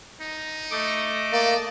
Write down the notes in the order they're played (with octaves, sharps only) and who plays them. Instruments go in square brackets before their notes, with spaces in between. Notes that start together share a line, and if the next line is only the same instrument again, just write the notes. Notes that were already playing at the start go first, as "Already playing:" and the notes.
[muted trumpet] D#4
[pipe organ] A3 D#5 D6
[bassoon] A#3 [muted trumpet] D5